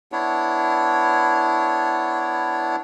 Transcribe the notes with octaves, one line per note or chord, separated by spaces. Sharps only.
B3 D4 E4 C#5